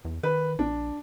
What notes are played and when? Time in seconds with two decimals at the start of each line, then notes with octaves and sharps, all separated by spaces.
0.05 E2
0.23 D#3 B4
0.59 A#1 D4